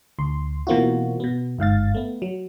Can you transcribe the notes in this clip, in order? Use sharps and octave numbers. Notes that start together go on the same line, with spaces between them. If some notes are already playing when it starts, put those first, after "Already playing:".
D2 C6
B2 E3 A#3 C4 F4 F#4
B2 B3
G1 G#2 F5 A6
A3 B3
F#3